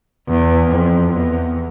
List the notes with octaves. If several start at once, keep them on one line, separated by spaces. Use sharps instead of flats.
E2
F2
E2